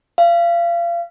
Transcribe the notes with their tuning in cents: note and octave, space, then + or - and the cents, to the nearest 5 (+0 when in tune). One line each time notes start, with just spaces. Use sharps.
F5 -30